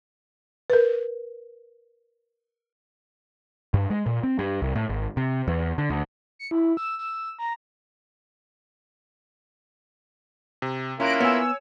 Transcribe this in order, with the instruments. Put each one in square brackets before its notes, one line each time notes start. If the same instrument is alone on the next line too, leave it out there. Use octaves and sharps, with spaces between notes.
[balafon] A#4 B4
[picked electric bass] G2
G#3
A#2
C4
G2
C2
A2
G#1
C3
E2
D3
D2
[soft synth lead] C#7
E4
E6
E6
A#5
[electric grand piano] C3
[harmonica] A#3 E4 F4 [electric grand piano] C#4 [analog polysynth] A#5 F#6 D7
[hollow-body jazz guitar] B3 [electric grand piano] C#5 G#5 [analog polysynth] E6